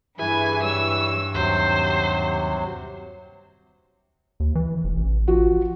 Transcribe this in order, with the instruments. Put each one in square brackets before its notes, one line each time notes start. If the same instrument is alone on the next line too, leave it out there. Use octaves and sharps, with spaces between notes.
[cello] G2 [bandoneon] E3 [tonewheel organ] E4 G#4 B4 [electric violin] G#5
[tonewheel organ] G3 C#5 [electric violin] E6
[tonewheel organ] D#2 [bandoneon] C3 F#3 [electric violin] C5
[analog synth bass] D#2
E3
F1
A1
[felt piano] F3 F#4